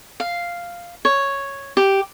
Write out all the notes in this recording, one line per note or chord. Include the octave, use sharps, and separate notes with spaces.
F5
C#5
G4